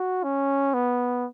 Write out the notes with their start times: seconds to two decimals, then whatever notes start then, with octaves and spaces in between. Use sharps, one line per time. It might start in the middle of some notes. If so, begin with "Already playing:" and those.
Already playing: F#4
0.24 C#4
0.74 B3